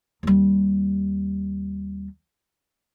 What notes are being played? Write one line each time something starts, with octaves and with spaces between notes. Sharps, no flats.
D#2 G3